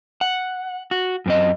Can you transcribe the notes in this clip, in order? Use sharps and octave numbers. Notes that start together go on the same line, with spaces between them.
F#5
F#4
F#2 C4 D#5